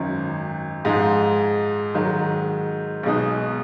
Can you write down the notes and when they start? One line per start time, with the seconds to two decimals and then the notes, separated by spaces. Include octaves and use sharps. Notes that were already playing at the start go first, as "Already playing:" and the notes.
Already playing: G#1 F#2 D#3
0.85 G#2 F3 G#3 D#4
1.94 G#2 D#3 F#3
3.03 B1 B2 G#3 D#4